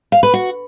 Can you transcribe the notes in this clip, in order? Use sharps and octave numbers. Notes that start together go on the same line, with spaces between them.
F5
B4
F#4